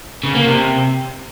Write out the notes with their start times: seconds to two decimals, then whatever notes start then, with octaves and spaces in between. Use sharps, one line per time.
0.24 C#3
0.35 A#3
0.46 C3